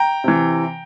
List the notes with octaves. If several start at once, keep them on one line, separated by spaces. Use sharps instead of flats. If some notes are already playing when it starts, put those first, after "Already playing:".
Already playing: G5 A#5
C3 E3